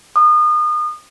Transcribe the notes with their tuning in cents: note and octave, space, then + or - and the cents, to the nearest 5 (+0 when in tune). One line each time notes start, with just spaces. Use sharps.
D#6 -35